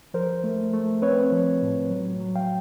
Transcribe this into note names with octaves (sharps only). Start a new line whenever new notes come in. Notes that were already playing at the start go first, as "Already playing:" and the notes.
F3 A#4 C5
A3
A3
C4 B4 C#5
F3
A2
F#3
F#3
F5 G5